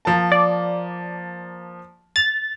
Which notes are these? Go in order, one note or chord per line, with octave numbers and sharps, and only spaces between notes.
F3 A#3 A5
D5
A6 F7